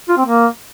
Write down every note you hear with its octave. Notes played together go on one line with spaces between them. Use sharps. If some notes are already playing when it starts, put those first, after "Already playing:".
F4
C4
A#3